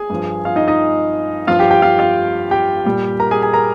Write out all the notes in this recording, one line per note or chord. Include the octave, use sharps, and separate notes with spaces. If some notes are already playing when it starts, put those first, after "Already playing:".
Already playing: G#4 G#5
G2 F3
F4 F5
D#4 D#5
D#4 D#5
G2 F3 F4 F5
G4 G5
G4 G5
F4 F5
F4 F5
G4 G5
A#2 G3
A#4 A#5
G#4 G#5
G#4 G#5
A#4 A#5